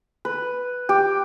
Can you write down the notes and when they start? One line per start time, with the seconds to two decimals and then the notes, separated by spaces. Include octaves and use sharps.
0.25 B4
0.89 G4